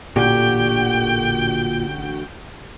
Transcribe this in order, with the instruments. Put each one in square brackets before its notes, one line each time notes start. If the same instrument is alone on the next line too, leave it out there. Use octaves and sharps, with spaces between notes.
[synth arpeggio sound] A1 D3 F#4 [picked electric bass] A#2 [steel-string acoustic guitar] G4 [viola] G5